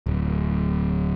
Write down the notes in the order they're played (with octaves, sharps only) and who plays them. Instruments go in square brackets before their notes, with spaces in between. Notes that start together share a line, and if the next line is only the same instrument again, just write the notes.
[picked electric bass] D1